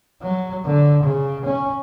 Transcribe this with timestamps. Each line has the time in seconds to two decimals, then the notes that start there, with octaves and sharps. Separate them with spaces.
0.22 F#3
0.65 D3
1.03 C#3
1.45 C#4